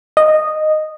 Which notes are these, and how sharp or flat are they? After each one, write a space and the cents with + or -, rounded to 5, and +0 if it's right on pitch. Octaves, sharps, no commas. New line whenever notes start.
D#5 -10